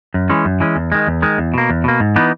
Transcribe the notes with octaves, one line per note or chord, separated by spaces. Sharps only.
F#2
E3 G#3 C#4
F#2
E3 G#3 C#4
E2
D#3 G#3
E2
D#3 G#3
E2
B2 A#3
E2
B2 A#3
G#2
E3 B3 D#4